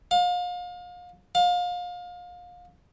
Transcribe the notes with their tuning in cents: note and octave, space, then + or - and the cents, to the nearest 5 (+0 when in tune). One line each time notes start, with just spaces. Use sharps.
F5 +35
F5 +30